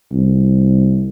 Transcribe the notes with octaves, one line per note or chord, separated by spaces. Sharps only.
C2